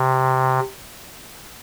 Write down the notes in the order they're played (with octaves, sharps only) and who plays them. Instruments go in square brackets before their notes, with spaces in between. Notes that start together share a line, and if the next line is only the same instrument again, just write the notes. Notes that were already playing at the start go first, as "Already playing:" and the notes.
Already playing: [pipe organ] C3